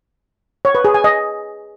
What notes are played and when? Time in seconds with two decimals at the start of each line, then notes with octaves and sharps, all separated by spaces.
0.65 C#5
0.75 B4
0.85 G#4
0.94 G#5
1.04 D#5